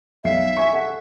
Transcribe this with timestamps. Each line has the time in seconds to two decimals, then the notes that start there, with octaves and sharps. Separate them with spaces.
0.24 B1 E5 F5 C7
0.57 G#5 C#6
0.73 A4 F#5